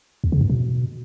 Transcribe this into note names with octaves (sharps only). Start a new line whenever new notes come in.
E2
C#3
G2
B2